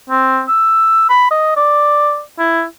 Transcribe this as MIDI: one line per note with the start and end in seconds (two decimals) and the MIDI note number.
0.10 0.42 60
0.48 1.07 88
1.10 1.29 83
1.31 1.55 75
1.56 2.20 74
2.39 2.64 64